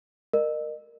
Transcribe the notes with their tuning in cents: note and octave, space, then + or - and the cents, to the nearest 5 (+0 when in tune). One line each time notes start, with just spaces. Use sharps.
A#4 +0 D#5 -35